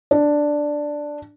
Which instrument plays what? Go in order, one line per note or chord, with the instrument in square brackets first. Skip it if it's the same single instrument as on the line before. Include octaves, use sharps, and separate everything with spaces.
[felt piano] D4